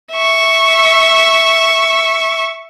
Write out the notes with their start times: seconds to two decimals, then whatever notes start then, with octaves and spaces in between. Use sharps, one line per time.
0.13 E5 C#6